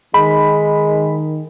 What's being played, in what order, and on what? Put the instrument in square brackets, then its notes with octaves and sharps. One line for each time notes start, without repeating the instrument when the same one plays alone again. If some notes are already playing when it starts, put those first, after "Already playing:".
[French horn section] D#3 [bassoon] G#3 [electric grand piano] B5